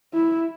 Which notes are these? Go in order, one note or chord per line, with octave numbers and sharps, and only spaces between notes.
E4